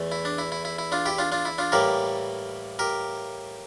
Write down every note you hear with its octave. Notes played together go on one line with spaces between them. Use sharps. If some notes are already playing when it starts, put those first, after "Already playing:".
Already playing: E2 E3 A3
E4
D4
E4
E4
E4
E4
D4 F4
E4 G4
D4 F4
D4 F4
E4
D4 F4
A2 E3 G3 A#3 G4 A#4
G4 A#4